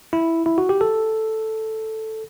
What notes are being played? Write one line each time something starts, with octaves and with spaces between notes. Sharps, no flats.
E4
E4
F#4
G4
A4